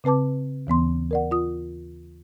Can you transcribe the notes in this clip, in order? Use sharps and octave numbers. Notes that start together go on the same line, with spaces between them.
C#3 C4 B4 A5 D6
D#2 E3 B3 C6
A#4 D5 F#5
F4 D#6